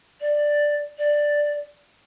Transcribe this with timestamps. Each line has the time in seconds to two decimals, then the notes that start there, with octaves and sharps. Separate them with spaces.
0.20 D5
0.98 D5